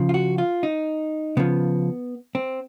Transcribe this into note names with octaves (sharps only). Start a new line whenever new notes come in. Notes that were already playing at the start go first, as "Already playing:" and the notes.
Already playing: C#3 F3
F4
F#4
F4
D#4
C#3 F3 B3
C4